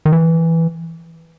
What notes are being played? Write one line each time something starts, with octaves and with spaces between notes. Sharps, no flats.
D#3
E3